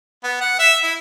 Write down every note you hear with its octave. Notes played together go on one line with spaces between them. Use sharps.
B3
F#5
E5
E4